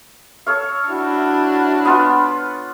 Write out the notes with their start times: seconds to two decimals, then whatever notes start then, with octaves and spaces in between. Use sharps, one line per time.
0.46 A4 C#5 F5
0.89 D4 E4 F#4
1.85 B3 F4 F#5